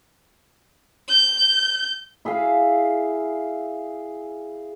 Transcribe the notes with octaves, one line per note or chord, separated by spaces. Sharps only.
G6
E4 G#4 E5 F5